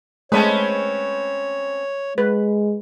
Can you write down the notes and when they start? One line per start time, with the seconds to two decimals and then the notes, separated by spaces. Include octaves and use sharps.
0.32 G#3 A3 C4 C#4 B4 C#5 A5
2.18 G#3 B4